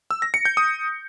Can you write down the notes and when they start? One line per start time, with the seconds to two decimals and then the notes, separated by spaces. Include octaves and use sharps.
0.11 E6
0.22 A#6
0.34 C#7
0.45 G6
0.57 D#6